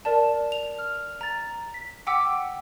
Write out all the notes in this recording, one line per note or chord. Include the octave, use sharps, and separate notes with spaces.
A#4 D5 A5
F7
F6
A#5 A6
B6
F#5 G5 D6 E6 B6